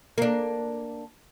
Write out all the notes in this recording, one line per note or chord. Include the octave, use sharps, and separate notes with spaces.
A#3 D4